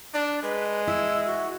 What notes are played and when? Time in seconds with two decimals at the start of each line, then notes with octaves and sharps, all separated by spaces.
0.14 D4 D5
0.43 G#3 B4
0.87 E4 E6
1.26 F#4